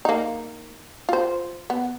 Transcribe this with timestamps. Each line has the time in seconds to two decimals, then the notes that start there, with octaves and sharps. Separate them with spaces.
0.05 A#3 D#4
1.09 F4 C5
1.70 B3